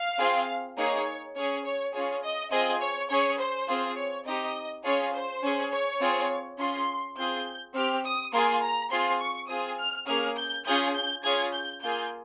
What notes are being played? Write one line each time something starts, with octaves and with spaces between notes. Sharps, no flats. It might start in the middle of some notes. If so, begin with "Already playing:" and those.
Already playing: F5
C4 F4 G#4
A#3 D#4 G#4 C#5
C#4 G#4 C#5
C#5
C#4 F4 G#4 C#5
D#5
C4 F4 G#4 D#5
C#5
C#4 G#4 C#5
C5
C4 F4 G#4
C#5
C4 D#4 G4 D#5
C#4 F4 G#4 C#5
C5
C#4 G#4
C#5
C4 F4 G#4
C#4 F4 G#4 C6
C4 F4 G#4 G6
C4 G4 F6
D#6
A#3 F4 G#4 C6
A#5
C4 F4 G#4 C6
C#6
C4 F4 G#4 D#6
F6
A#3 C#4 G#4 F6
G6
C#4 F4 G#4 G6
G6
C#4 F4 G#4 G#6
G6
A#3 F4 G#4 G6